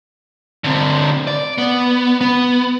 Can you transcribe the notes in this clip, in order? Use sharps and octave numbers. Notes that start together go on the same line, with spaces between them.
D3 C4
D5
B3
B3